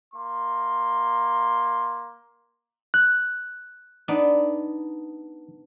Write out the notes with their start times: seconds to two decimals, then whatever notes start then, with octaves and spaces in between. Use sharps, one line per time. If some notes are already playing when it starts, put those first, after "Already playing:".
0.14 A#3 C6
2.94 F#6
4.08 B3 D4 D#4